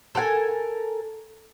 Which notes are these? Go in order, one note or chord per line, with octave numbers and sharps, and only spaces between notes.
A4 A#4 F#5 G#5